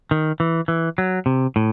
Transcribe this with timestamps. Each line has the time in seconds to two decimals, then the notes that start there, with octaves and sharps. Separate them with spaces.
0.11 D#3
0.40 E3
0.68 E3
0.98 F#3
1.26 C3
1.56 A2